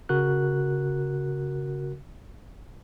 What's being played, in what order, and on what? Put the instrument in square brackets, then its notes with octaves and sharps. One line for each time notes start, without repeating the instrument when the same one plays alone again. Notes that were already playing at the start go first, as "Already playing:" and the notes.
[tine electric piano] C#3 F#4 A#4 F#6